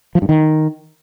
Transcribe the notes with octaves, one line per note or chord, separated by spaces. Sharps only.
F3
G2
D#3